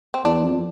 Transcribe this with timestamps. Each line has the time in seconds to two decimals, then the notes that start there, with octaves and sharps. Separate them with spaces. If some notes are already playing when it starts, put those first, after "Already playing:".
0.14 C4
0.25 E2 D4
0.43 F2